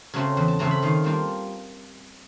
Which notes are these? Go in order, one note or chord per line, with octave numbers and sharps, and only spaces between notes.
C#3 F#3 A3 C4
E2
A5
C#3 F#3 A3 C4 A#5
B5
D#3 F5
G3 A#3 D4 F4